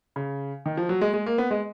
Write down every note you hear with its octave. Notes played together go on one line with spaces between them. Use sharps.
C#3
D#3
F3
F#3
G#3
G#3
A#3
B3
G#3